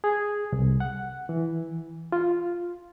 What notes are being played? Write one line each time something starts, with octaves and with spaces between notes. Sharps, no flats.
G#4
C2
F#5
E3
F4